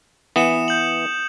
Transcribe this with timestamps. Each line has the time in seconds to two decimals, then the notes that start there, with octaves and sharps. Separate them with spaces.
0.36 E3 B3 D#6 C#7 E7
0.68 G6 F#7